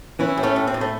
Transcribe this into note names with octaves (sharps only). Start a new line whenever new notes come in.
E3 C#4 E4
A2
A3 C#4
A2
C4
A2
A3